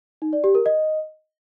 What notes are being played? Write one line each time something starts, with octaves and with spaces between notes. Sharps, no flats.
D#4
D5
G4
A#4
D#5